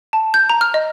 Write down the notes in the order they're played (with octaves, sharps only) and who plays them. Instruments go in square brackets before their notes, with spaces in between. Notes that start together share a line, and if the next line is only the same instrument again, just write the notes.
[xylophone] A5
G6
A#5
F6
D#5